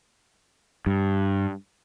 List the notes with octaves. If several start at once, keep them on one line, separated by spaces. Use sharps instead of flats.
G2